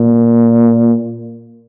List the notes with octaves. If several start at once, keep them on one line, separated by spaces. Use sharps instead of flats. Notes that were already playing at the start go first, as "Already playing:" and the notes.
Already playing: A#2